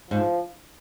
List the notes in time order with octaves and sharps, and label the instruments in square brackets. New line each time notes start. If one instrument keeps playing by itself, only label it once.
[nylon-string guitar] G#2 [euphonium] F3